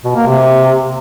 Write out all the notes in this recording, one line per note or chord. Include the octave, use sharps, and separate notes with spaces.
B2
A#3
C3